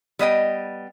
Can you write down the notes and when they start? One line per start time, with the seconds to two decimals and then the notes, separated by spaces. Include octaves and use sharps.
0.19 G3 B3 D#5 G5